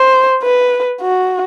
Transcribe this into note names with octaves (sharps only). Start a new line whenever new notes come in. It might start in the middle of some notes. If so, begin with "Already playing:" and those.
Already playing: C5
B4
F#4